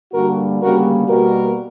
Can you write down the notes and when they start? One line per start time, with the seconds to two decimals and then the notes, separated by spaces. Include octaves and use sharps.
0.13 G2 D3 G3 A#3 F#4 A#4
0.60 D2 C#3 G3 A#3 F#4 A#4
1.08 B2 G3 A#3 F#4 A#4